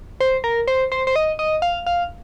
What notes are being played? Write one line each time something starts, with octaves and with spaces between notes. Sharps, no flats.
C5
A#4
C5
C5
C5
D#5
D#5
F5
F5